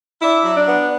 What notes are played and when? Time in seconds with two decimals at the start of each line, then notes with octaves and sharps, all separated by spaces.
0.20 D4 E4 E5
0.45 F#3
0.55 D4 D5
0.68 B3